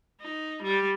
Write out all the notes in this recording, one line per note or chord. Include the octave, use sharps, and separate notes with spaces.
D#4
G3